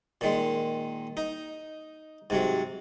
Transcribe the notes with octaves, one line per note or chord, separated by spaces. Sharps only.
A#2 D#3 G#3
D#4
G#2 C3 F#3